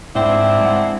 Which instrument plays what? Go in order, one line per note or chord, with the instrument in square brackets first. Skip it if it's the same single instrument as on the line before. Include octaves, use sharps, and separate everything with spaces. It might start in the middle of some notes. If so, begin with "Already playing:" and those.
[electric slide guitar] G#2 [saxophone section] C4 D4 E4
[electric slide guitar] G#3 F#5